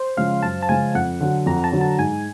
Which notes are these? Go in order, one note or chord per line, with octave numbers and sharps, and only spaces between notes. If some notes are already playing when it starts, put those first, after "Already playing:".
Already playing: C5
C#3 F3 G#3 C#4 F5
F#2 A5
A5
C#3 F3 G#3 C#4 G#5
F2 F#5
D3 F#3
F2 A#5
A5
D3 F#3
A5
G#2 G#5